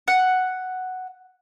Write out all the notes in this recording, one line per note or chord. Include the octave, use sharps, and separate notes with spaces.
F#5